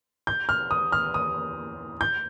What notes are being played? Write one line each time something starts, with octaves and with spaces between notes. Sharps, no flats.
G6
F6
D#6
F6
D#6
G6